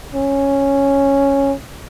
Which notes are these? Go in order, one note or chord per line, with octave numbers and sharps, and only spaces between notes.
C#4